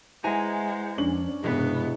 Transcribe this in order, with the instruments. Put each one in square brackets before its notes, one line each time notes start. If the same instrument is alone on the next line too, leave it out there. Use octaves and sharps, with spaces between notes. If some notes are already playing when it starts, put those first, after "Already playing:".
[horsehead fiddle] G#3 [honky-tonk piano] E4 [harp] B4 G#5 A#5 [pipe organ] C5 F#5
[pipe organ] F2 F3 [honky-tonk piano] C#4 D4 F#7
[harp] E1 E5 [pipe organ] G2 C3 G#3 [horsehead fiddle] B3